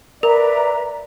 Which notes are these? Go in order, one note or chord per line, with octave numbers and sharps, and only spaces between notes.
A#4 B4 D5 E5 A#5